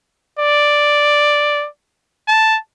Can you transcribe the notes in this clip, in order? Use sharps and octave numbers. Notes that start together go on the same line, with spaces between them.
D5
A5